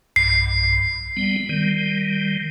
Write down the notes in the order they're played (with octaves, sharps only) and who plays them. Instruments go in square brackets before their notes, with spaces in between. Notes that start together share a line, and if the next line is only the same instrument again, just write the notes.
[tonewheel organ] B1 G2 [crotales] C7
[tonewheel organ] G3 B3
D#3 G3